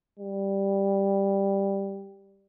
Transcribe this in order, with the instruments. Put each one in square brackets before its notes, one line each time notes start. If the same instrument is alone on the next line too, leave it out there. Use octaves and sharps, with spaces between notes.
[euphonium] G3